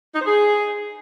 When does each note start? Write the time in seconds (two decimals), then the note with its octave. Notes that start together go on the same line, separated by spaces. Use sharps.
0.13 D#4
0.19 C5
0.25 G#4